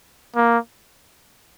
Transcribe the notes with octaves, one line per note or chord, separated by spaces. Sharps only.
A#3